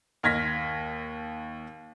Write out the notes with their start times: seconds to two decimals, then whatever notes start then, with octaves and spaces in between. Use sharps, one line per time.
0.23 D#2 F6 G#6 A#6 B6